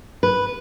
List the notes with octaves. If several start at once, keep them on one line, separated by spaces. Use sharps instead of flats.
B4